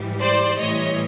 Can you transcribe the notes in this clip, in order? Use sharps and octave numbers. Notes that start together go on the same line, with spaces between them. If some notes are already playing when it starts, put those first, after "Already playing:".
Already playing: G#2 E3 G3
C5 D5
A2 E3 G3 C#5 D#5